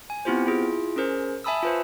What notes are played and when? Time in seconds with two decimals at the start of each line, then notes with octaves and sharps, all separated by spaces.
0.10 G#5
0.25 B3 C4 E4 F4 G4 C5
0.46 E4 F4 G#4
0.96 C#4 G#4 A#4 C5
1.44 E5 G#5 A5 B5 D#6 E6
1.63 F4 B4 C5